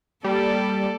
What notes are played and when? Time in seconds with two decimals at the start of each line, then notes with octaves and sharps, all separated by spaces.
0.24 G3 A#3 A4 D5